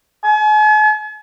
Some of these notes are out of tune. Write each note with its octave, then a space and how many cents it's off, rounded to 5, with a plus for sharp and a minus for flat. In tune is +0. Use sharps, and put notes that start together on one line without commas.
G#5 +45